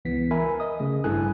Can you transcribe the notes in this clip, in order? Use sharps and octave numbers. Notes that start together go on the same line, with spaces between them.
C#2 E3 B3 B6
A#4 E5 G#5 B5
D#5 D#6
C#3 A3
G#1 G2 E4 A4 G#5 F#6